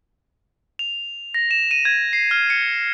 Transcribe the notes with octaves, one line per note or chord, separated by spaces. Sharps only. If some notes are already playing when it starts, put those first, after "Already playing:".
F7
A#6
E7
D#7
G#6
C7
F6
C#7